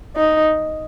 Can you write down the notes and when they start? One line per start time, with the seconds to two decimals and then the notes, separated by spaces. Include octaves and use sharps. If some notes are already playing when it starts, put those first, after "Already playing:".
0.16 D#4